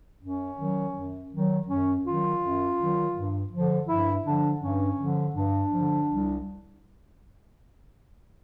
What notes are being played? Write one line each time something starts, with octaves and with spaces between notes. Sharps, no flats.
F#2 C#4
D#3 F#3
F#2
D#3 F#3
F#2 C#4
D#3 F#3 F4
F#2
D#3 F#3
G2
D3 F3
G2 E4
D3 F3 D4
G2 C#4
D3 F3
G2 D4
D3 F3
C2